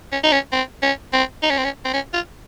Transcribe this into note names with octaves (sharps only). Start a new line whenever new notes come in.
C#4
D#4
C#4
C4
C#4
C4
D#4
C#4
C4
C#4
C4
C#4
F4